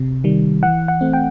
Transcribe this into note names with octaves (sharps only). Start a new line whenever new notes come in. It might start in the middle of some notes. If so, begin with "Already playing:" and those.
Already playing: C3
D#3 G3
E3 F#5
F#5
A3 C4
G5